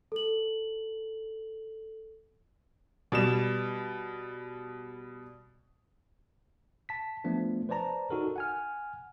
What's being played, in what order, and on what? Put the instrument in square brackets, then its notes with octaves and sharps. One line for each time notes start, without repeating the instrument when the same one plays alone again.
[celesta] A4 F#7
[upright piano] B2 G3 E7
[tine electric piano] A5 B6
F3 A3 B3 D4
B4 C5 D5 A5 A#5
D#4 F#4 A4 A#4
F#5 G#5 F6